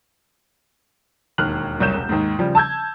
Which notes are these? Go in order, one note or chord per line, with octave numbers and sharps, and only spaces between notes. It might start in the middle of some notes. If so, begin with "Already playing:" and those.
E1 D#2 F6 F#6 F#7
F#1 C2 C#5 G6 E7
E1
D#2 G#2
C#3 F3 G3
A5 E6 G6 G#6